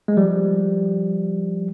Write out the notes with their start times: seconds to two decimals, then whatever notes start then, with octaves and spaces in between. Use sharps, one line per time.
0.08 G#3
0.17 F3 G3